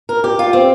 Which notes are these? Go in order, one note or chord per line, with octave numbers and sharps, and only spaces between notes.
A#4
G4
F4
C4